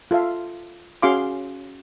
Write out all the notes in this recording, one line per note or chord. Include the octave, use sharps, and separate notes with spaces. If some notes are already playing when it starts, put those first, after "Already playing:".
F4 A4 E5 F5
C#4 F#4 G#4 F5 C6 D6